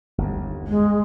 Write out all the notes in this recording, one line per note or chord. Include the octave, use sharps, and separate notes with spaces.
G1 D#2
G#3